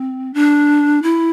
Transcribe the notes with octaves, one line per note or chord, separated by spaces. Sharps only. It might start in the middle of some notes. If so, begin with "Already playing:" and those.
Already playing: C4
D4
E4